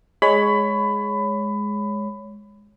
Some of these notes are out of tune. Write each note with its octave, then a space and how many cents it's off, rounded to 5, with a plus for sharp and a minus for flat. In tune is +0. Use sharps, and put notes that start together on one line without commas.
G#3 +0 C#5 +5 B5 +20